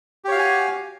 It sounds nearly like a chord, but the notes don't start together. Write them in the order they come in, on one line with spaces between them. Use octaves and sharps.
G4 C#5 F5 F#4 G#5